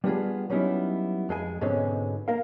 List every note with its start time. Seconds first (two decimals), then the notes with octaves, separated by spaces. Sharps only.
0.04 G3 B3 D4 D#4 F4 G#4
0.50 F#3 G3 B3 C#4 D#4 E4
1.29 F2 G#3 A4 G#5
1.61 G#2 B2 D3 G#3 C4 C#4
2.28 A#3 A#4 F5